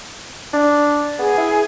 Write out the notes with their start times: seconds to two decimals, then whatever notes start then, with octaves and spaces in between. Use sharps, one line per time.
0.54 D4
1.19 B3 G#4
1.38 E4